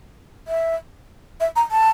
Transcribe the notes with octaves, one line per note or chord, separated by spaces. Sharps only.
E5
E5
A#5
A5